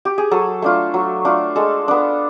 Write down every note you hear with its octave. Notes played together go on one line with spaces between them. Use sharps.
G4
G#4
F#3 A4
A3 D4 F4
F#3
A3 D4 F4
G#3 A4
B3 D4